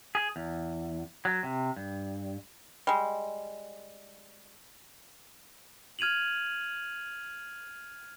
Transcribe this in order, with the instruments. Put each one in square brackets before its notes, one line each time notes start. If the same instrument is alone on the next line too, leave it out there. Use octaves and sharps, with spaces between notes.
[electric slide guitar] G#4
E2
F#3
C3
G2
[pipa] G3 G#3
[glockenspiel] F6 G#6 D#7 F7 F#7